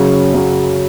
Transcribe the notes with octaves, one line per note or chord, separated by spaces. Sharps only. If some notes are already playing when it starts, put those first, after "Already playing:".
Already playing: F#2 C#3 F#3 C#4
F#2 C#3 F#3 C#4